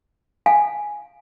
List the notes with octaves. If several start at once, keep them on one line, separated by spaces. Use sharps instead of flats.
F5 G#5